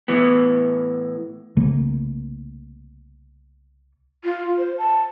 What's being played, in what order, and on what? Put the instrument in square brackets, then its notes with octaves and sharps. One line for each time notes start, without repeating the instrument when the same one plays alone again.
[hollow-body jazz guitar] A2 E3 B3
[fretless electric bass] C2 C#3 A3 A#3
[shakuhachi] F4
C5
A5